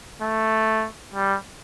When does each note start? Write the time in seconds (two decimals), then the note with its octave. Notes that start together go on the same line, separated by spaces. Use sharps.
0.22 A3
1.15 G3